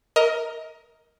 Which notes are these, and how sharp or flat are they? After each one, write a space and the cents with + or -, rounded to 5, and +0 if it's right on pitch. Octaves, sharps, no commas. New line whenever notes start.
A#4 +0 D#5 +25